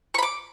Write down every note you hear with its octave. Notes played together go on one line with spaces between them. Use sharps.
B5 C#6 D6